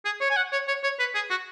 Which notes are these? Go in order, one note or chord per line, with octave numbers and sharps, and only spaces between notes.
G#4
C#5
G#5
F#5
C#5
C#5
C#5
B4
G#4
F#4